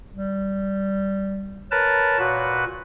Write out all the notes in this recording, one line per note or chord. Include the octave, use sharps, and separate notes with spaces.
G3
A#4 B4 C#5 A5
A#2 F#4 B4